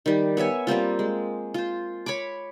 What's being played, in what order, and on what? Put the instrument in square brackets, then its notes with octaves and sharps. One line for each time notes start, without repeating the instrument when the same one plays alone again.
[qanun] D#3 G3
B3 C#5 E5 G#5
G3 A#3 C4 F4
G#3
F4 C5
C#5 B5 C#6 D6